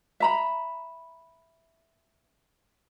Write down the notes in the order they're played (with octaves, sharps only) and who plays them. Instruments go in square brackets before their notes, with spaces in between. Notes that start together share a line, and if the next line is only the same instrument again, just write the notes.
[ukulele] E5 A#5 B5